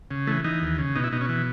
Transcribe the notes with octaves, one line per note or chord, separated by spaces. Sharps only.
C#3
E3 A3
E3 D#4
D#2
C#3
B2 D#4
E4
B2 D#4
C#4
E3